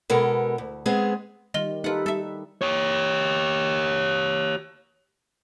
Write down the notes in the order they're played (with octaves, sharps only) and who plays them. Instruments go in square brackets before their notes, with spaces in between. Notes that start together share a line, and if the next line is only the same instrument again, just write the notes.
[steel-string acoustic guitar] B2 G#3 B3 A4 A#4
D2
G#3 B3 C4 G#4
[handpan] D#3 G3 [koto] F4 [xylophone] D#5 G7
[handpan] D#4 A4 B4 [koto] F4 F#5 [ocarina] G4
[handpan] G3 [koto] A4 E5
[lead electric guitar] G4 C#5